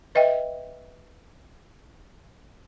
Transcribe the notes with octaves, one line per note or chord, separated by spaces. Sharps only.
B4 D#5 E5 G5